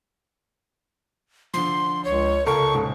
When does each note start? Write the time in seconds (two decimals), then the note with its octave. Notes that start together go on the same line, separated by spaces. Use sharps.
1.54 D3 F3 C6
2.05 C#2 C#5
2.46 C#2 A4 A#4 C#6
2.74 D#1 G#2 C#3